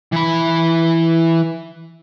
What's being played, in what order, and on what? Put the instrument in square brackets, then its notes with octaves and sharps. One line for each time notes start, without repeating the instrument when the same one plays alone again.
[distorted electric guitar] E3 B5